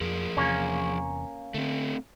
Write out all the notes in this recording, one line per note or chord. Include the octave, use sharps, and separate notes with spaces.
F2 F3 G#4 A#4
E2 C3 A#3 C#4
D3 A3 C4